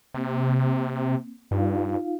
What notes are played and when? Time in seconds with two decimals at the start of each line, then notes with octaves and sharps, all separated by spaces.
0.14 C3 A#3 C4
1.51 G2 D#4 F4 F5